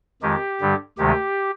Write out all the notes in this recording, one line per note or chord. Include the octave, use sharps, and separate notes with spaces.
F2 D#3 G#3 G4
G2 D3 G3
D2 C3 D#3 G#3 G4